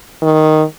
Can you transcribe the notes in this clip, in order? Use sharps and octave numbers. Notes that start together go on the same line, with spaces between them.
D#3